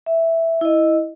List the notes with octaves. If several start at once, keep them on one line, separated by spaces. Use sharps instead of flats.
E5
E4 D#5